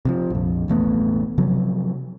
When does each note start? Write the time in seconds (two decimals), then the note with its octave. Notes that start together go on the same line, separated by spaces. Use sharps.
0.05 C3 D#3 F3
0.30 A#1 F2
0.68 E1 A1 A3 B3
1.38 C3 F3 F#3